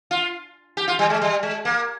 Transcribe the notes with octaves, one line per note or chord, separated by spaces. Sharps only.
F4
G4
F4
G3
G#3
G3
G#3
A#3